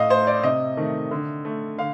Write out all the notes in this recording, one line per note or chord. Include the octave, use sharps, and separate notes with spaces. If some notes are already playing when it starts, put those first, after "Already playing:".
Already playing: A2 D#5 F5
A3 C5
D5
C3 D#5
D#3 A3
D3
A3
D3 F5